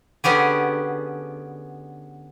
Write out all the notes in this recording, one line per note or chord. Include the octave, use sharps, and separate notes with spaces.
D3 B3 C#4 G4 G#4